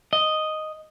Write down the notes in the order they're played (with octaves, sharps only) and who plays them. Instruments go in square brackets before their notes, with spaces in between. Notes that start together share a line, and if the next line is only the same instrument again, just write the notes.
[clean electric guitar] D#5